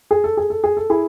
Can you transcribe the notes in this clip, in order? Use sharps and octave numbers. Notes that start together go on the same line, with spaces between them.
G#4
A4
G#4
A4
G#4
A4
E4 G#4